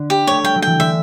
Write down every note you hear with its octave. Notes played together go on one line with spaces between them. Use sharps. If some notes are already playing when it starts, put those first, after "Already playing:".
Already playing: D3
G4
A3 C#5
G3 G5
F#3
E3 G5
D3 E5